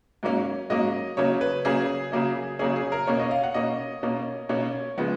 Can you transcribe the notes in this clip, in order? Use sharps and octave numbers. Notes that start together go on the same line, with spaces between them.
G#2 F#3 A#3 C#4
G#2 F#3 A#3 C#4 D#5
C#3 F#3 A#3 C#4 C#5
B4
C#3 F#3 A#3 C#4 G#4
C#3 F#3 A#3 C#4
C#3 F#3 A#3 C#4 G#4
G#4
A#4
B2 A#3 C#4 C#5
D#5
F5
F#5
B2 A#3 C#4 D#5
B2 A#3 C#4
B2 A#3 C#4 C#5
C#3 F3 G#3 B3